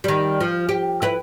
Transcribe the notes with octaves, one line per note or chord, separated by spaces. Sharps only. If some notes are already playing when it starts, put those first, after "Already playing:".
D#3 G3
F3
G4
E4 B4